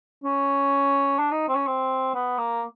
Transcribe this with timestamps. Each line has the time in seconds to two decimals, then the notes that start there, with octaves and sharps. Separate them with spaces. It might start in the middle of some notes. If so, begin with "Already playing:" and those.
0.24 C#4
1.19 D4
1.31 D#4
1.48 C4
1.55 C#4
1.67 C4
2.14 B3
2.38 A#3